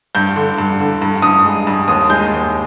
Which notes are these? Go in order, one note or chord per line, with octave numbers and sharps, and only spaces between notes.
G2 G6
D3
G2
D3
G2
G2 D#6
G#3
G2
D#2 D#6
G#3 G6
D#2